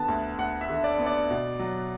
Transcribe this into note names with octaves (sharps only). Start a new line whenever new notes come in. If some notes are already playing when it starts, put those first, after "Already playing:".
Already playing: D3 B3 A5
D2
D2 F#5
E5
D3
D5
B3
D5
B2
F#3